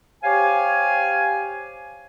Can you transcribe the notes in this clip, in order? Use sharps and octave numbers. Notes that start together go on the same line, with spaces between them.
G4 C5 C#5 F5 G#5